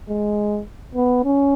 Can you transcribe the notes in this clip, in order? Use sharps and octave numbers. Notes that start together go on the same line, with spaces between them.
G#3
B3
C#4